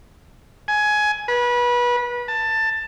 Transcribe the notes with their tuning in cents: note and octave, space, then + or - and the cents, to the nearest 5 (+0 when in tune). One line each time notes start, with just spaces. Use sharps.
G#5 +15
B4 -25
A5 +15